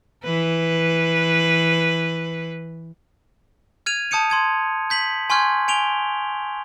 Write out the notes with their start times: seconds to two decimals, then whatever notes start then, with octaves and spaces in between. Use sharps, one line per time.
0.24 E3 B4
3.86 F6 G#6 D#7 F7
4.11 A5 D#6 G6 C#7 D#7
4.30 C6 G#6 D#7
4.90 G6 B6 F#7
5.30 G#5 C6 C#6 F6 G6 G#6
5.68 G#5 D7 F7 G7